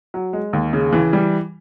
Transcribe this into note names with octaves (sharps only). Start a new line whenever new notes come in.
F#3
G#3
D#2
C#3
E3
G3